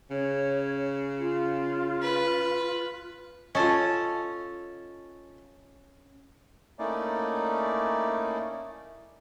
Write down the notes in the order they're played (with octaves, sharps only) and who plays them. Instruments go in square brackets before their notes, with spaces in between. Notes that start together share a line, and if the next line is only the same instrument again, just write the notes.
[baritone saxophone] C#3 [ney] C#5
[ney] F4
[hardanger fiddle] B4
[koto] C#4 A4 [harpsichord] F4 D#5
[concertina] A3 A#3 C#4 D#4 E4 D5